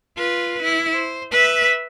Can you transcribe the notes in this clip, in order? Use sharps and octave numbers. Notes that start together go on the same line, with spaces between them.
F4 B4
E4
C5
B4 E5